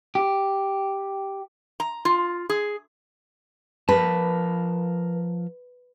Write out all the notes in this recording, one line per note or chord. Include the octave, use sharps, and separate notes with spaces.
G4
A#5
F4
G#4
F3 A#4 B4 A5